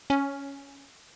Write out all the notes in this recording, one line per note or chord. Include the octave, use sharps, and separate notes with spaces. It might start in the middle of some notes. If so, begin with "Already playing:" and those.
C#4